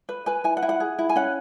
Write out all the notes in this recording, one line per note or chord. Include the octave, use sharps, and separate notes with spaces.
B4
B4 G#5
E4 G#5
F#5
E4
F#5
G#4
E4
G#5
C#4 F#5